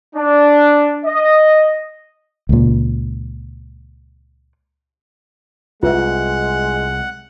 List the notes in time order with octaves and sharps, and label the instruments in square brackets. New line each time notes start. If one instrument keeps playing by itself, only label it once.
[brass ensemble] D4
D#5
[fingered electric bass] C#2 A#2
[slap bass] C2 [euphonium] G#3 [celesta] F4 B4 E5 [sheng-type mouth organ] F#5